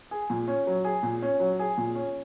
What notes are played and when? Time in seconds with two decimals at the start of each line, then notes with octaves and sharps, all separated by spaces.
0.11 G#4
0.30 A#2
0.48 C#4
0.67 F#3
0.84 G#4
1.03 A#2
1.22 C#4
1.40 F#3
1.59 G#4
1.78 A#2
1.95 C#4